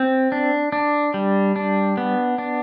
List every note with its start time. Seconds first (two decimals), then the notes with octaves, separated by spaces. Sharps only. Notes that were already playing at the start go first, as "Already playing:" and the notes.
Already playing: C4
0.32 D4
0.72 D4
1.14 G3
1.56 D4
1.97 B3
2.38 D4